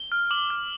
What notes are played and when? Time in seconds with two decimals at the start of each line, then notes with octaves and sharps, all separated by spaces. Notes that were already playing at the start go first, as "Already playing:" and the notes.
Already playing: G7
0.12 F6
0.31 D6 F#7
0.50 F6